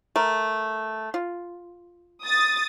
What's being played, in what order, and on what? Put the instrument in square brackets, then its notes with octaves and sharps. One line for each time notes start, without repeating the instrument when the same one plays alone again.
[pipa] A3 A#4
F4
[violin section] D#6 A6